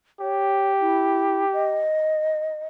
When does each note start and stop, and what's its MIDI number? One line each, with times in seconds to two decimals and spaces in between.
0.20 1.86 67
0.20 0.73 73
0.80 1.45 64
1.53 2.66 75